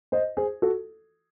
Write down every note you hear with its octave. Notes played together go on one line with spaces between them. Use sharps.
C5 D#5
G#4 C5
F#4 A4